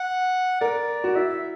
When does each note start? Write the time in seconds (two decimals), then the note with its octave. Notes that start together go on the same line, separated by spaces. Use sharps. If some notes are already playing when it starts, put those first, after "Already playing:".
Already playing: F#5
0.61 A#4 D5
1.04 F#4
1.15 E4 E5